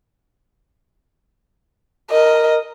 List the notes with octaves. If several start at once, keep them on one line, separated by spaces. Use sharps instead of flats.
A#4 D#5